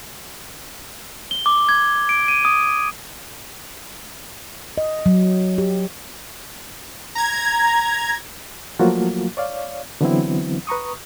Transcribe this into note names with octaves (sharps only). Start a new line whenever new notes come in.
G7
D6
G#6
D7
D#7
D#6
D#5
F#3
G4
A#5 G#6
F3 F#3 A3 A#3 F4 F#4
C#5 D5 F5
D3 E3 F#3 B3 C4 E4
B4 A#5 C#6 D#6